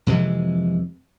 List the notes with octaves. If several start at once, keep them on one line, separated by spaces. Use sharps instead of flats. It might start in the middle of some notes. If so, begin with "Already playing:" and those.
F2 C3 E3 G#3